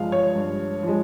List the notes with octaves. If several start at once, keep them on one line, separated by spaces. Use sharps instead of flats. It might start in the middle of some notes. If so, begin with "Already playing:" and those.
Already playing: G2 F3 G#3 F5
C#5
G2
F3 G#3